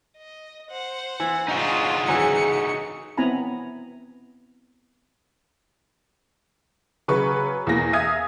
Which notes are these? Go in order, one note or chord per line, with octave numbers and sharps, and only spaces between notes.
D#5
C5 F#5
E3
D4 D#4 F4 F#4 G#4
C#3 E3 F#3 C#7
B3 C4 E4 G#5 A#5 B5
C#3 F#3 B4 B5 C#6
E2 A#3 A#6
E5 F5 G#5 D#6 G#6